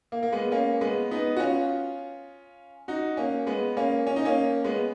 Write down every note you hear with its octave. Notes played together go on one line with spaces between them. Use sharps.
A#3
A#3
G#3 B3
A#3 C#4
G#3 B3
B3 D#4
F#4
C#4 F4
D#4 F#4
A#3 C#4
G#3 B3
A#3 C#4
C#4
D#4
A#3 C#4
G#3 B3